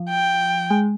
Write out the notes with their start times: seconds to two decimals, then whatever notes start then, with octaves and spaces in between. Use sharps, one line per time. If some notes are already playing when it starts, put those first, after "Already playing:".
Already playing: F3
0.09 G5
0.70 G#3